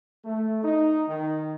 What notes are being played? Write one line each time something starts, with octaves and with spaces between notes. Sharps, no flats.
A3
D#4
D#3